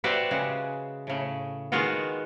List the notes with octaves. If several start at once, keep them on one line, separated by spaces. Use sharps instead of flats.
F#4 G4 B4 C5 D5 E5
C#3 G#3
A2 C#3
D#3 G#3 B3 F4 F#4